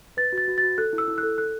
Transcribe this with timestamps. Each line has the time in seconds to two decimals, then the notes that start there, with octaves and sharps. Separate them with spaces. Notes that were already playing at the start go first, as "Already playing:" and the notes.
0.17 B4 A6
0.33 F#4
0.38 A6
0.48 F#4
0.58 F#4 A6
0.78 A4 F#6
0.93 E4
0.98 E6
1.08 E4
1.18 F#6
1.23 A4
1.38 A4 F#6